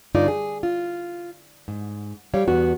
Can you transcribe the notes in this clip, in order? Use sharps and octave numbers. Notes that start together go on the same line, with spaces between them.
G2 D3 D#4 F4 D5
G#4
F4
G#2
G3 C#5 F5
E2 B3 F#4